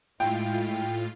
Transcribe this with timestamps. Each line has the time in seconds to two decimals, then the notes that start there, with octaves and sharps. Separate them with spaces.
0.20 A2 G#3 E4 F4 G5